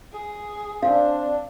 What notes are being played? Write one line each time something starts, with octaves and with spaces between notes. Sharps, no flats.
G#4
C4 D4 F5